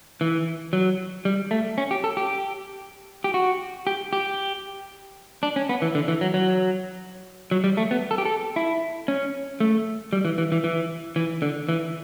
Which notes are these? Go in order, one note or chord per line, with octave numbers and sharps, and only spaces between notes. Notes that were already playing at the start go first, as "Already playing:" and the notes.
E3
F#3
G3
A3
C#4
G4
A4
G4
G4
F#4
G4
G4
D4
C#4
B3
E3
D3
E3
F#3
F#3
F#3
G3
A3
B3
A4
G4
A4
E4
C#4
A3
G3
E3
E3
E3
E3
E3
D3
E3